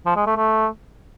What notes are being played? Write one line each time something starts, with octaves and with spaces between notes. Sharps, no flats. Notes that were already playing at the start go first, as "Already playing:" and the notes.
F3
G#3
A3
A3